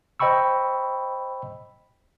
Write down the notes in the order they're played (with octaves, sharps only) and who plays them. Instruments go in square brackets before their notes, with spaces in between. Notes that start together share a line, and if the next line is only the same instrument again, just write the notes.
[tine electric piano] C5 D#5 G5 B5 C#6 E6